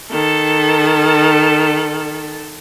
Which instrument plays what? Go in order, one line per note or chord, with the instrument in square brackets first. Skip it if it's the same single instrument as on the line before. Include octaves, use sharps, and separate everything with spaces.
[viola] D#3 A4